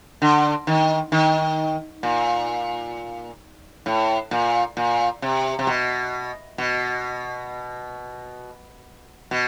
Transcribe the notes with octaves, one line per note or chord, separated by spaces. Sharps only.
D3
D#3
D#3
A#2
A2
A#2
A#2
C3
C3
B2
B2
B2